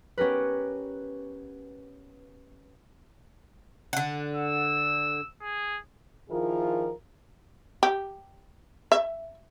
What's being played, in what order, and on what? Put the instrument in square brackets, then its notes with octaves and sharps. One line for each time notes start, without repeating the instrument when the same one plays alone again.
[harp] B3 C#4 G4 A#4 B4
[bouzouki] D3 F#5
[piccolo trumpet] E6
G#4
[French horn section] D#3 F3 E4 F4 G#4 A#4
[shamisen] G4
E5